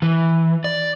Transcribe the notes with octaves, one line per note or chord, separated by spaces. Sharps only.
E3
D5